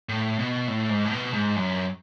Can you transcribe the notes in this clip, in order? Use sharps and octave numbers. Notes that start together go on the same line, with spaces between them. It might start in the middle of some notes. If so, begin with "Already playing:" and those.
A2
B2
A2
G#2
A2
B2
G#2
F#2